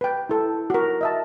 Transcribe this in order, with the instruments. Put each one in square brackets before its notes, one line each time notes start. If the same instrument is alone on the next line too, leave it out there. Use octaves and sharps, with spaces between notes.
[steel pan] B4 G5
E4 A4
F#4 A#4
D#5 E5 A5